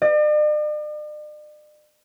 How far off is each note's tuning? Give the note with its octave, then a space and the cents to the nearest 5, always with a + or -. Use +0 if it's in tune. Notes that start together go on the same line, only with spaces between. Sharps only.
D5 +45